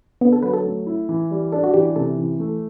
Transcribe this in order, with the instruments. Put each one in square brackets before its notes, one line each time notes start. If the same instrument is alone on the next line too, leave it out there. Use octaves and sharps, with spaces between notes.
[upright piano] D3 [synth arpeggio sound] B3
[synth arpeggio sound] A4
[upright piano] F#3 [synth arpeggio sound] B4
[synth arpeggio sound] A4
[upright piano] A3
E4
E3
G3
[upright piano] D4 [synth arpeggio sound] A4
[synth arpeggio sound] F#4
[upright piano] E3 [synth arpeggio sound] G4
[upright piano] C3 [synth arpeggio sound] A4
[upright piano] E3
A3